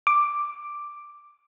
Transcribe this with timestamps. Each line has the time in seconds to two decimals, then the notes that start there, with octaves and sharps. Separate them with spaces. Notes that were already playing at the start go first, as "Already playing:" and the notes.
0.07 D6